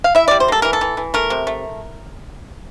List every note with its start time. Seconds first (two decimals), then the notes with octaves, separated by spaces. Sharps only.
0.04 F5
0.15 E4 E5
0.28 G3 D5
0.40 C5
0.48 A#3 A4
0.62 E3 A#4
0.73 A4
0.81 E3
0.97 E3
1.14 A3 A#4
1.30 C3
1.47 A3